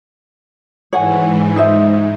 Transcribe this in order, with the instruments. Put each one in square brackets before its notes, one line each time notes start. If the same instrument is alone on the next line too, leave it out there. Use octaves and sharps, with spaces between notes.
[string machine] G#2 E3 [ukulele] C#5 F#5 G#5
[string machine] G#2 [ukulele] D#4 C5 E5